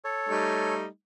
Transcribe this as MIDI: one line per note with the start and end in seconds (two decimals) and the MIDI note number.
0.04 0.74 69
0.04 0.74 73
0.29 0.86 55
0.29 0.86 57
0.29 0.86 63